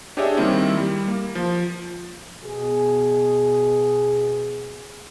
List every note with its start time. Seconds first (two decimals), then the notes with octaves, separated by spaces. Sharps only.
0.17 D4 G4 G#4 C#5 D#5 E5
0.37 D#3 G3 A#3 C4 E4
0.77 G3
1.08 A#3
1.35 F3
2.43 B2 G#4